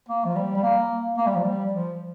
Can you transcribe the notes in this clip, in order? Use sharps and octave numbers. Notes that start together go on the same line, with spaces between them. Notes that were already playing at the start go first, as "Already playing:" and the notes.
A#3
F3
G3
G3
A#3
A#3
G3
F3
G3
F3